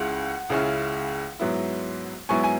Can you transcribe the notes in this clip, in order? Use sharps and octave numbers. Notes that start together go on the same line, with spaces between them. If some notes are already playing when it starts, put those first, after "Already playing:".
Already playing: C#2 C#3 G#3 C#4 E4 F#5
C#2 C#3 G#3 C#4 E4
G#2 F#3 B3 E4
G#2 F#3 B3 E4 G#5 C#6
G#5